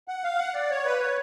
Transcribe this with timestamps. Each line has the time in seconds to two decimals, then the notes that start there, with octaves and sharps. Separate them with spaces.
0.08 F#5
0.24 F5
0.39 F#5
0.54 D5
0.70 C#5
0.85 B4
1.01 C#5